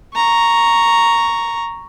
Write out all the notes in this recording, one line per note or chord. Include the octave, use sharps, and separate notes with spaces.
A#5 C#6